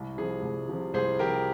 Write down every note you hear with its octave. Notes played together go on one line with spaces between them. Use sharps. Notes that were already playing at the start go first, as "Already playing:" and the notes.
Already playing: C2
C3 F3 G#4
C2
C3 F3
C2 G#4 C5
C3 F3 G4 A#4